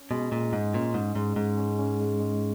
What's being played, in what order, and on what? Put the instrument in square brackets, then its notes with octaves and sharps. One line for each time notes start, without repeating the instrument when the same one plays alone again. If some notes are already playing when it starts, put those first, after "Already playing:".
Already playing: [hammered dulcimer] C#4
[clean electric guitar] B2 [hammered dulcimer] G#3
[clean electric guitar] A#2 [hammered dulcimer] G#3
[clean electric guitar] G#2 [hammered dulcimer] G#3
[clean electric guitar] A#2 [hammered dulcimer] C#4
[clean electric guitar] G#2 [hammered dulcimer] C#4
[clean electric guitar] G#2 [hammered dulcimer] G#3
[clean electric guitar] G#2 [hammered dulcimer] G#3
[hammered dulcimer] C#4
C#4
G#3
G#3